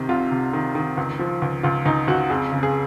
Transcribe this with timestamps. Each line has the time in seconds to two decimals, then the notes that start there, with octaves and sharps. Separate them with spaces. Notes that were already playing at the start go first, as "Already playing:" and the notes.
Already playing: C3 D#3
0.09 C2 F4
0.31 C3
0.53 D#3
0.75 D#3
0.97 C#2
1.19 F3
1.42 C#2
1.63 C#2 F4
1.85 C#2 D#4
2.07 C#2 F#4
2.30 F2 G#4
2.52 C#3
2.63 G#4